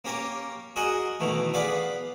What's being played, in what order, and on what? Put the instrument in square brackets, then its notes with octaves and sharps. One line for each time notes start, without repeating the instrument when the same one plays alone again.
[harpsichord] A#3 C#4 G4 A#4 C#5
F#4 G#4 A#4 D#5 F#5 G#5
B2 D#3 E3 A3
B3 G#4 B4 D5 F5 F#5